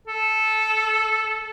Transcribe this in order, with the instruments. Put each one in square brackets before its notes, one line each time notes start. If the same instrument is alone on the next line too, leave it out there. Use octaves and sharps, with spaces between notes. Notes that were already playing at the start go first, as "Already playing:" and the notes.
[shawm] A4